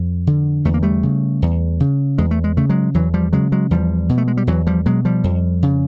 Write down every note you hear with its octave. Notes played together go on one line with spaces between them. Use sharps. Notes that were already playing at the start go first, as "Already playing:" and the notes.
Already playing: F2
D3
E2 A3
A#3
G3 A3
C#3
E2
C#3
E2 G#3
A3
G#3
C#3 A3
F#3 G#3
E2 E3 F#3
F3 G3
C#3 F#3 G#3
F#3 G#3
E2 F3 G3
B2
A3
G#3
G3
E2 E3 F#3
F3 G3
B2 F#3 G#3
F3 G3
F2
C#3